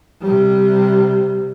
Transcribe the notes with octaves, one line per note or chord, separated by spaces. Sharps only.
C3 G3